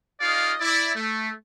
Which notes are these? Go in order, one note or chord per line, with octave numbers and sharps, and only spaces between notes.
D#4 F4 G#4 D5 D#5 F5
E4 D5
A3